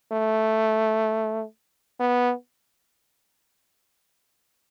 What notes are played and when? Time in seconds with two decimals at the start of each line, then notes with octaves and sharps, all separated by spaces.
0.12 A3
2.00 B3